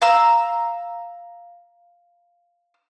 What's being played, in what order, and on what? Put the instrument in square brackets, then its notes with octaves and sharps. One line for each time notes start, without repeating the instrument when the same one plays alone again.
[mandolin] F5 A#5 E6